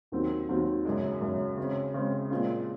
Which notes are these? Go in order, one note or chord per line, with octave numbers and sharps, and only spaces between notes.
D#2 D#3 F#3 C4
D#2 D#3 F#3 C4
F#2 C#3 G#3
F#2 C#3 G#3
C#3 G#3 C4
C#3 G#3 C4
A#2 G#3 C4 F4